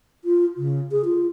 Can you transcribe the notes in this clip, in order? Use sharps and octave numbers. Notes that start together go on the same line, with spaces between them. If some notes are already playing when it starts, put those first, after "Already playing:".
F4
C#3
G#4
F4